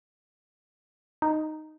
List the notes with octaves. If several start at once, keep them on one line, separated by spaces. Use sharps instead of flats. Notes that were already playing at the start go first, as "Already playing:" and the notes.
D#4